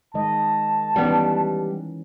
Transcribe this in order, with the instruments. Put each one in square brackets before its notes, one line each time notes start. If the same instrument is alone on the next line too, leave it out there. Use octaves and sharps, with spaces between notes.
[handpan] D#3 G#3 D#5 [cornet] A5
[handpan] E3 C#4 D#4 [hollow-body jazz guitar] G3 B3